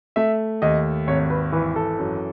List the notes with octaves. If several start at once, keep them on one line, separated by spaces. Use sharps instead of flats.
A3 E5
D#2 D#5
G#1 C#5
B4
E3 B4
A4
F#2